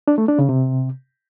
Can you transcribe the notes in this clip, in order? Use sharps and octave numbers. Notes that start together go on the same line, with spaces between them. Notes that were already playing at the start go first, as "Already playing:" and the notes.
D4
A3
D4
C#3
C3